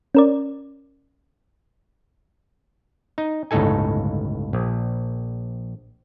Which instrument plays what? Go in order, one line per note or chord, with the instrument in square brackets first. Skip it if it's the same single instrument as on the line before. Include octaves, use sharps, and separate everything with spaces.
[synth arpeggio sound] C#4 A#4 D5
[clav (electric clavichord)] D#4
G1 C#2 A2 D#4 A4 G#5
A#1